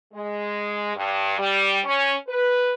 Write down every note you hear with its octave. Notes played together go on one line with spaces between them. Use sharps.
G#3
G2
G3
C#4
B4